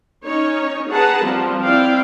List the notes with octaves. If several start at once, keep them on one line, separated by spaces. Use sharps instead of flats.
C#4 D#4 C#5
G#4 B4 F#5 A5 A#5
F3 G3 C4
C4 E4 D5 F5 G5